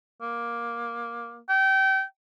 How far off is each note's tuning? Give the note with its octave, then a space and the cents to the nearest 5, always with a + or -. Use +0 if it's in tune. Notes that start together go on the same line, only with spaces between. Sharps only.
A#3 +10
G5 -30